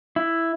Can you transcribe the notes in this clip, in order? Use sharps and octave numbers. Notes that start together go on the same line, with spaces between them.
E4